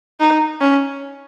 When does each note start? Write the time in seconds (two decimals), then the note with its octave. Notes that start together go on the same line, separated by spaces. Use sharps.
0.20 D#4
0.61 C#4